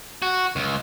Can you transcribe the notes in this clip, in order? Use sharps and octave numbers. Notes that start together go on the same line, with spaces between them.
F#4
C#2